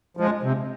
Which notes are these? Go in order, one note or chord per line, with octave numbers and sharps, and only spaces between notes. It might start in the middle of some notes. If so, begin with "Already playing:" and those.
F3 G#3
C3